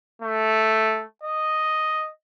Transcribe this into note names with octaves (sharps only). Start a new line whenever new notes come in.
A3
D#5